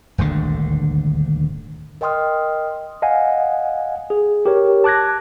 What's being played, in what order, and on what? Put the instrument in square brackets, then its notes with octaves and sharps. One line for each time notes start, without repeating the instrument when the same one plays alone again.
[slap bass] D#1 G#1 D2 D3
[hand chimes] A#4 D#5 G5 C6 D#6 F6
[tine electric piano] D#5 F5 F#5 G#5
G#4
G4 A#4 C#5
A5 D6 F#6 G#6 A#6